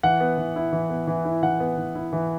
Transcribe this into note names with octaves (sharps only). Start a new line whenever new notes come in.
E3 F#5
B3
E3
E4
E3
B3
E3
E4
E3 F#5
B3
E3
E4
E3